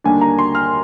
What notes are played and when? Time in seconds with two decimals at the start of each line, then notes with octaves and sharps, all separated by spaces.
0.04 D#2 D3 G3 A#3 D4 G#5
0.21 A#5
0.39 C6
0.55 F6